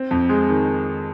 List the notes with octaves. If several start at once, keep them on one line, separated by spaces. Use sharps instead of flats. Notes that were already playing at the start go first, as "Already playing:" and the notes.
Already playing: C4
F2
G#3
D#3